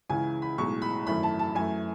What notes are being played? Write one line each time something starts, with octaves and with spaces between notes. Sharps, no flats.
C#2 C#3 E3 G#5
B5
B1 A2 G#3 C#6
B5
G#1 F#2 E3 A3 B5
A5
A5
F#2 E3 A3 G#5